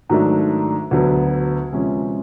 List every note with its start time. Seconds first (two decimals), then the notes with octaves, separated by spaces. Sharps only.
0.10 G#2 D#3 F#3 A3 D4
0.91 D2 D3 F#3 B3
1.72 C3 F3 G#3 C#4